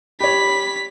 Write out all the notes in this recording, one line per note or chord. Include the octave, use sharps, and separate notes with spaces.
G4 C#5 B5 B6